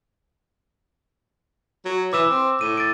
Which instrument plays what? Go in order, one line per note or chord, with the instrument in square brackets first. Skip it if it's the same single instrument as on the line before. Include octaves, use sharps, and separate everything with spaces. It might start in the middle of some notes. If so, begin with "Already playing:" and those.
[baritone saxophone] F#3
[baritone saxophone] E3 [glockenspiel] D6 E6 E7
[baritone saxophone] C4
[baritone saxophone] A2 [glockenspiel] D#7
[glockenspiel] A6 D7